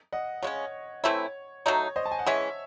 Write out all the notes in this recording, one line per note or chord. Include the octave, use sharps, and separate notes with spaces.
D#5 F#5
C#3 G#3 C#4 C#5
E3 A3 C4 E4 C#5
F#3 A3 D#4 C#5
C5 D#5
A5
G#5
F#5
E3 G#3 C#4 C#5 E5